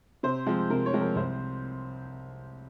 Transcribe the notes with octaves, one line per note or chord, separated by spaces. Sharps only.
C3 C5
F3 G#3 C4
C3 A#4
C#5
F3 G#3 C4
A#4
C2 C5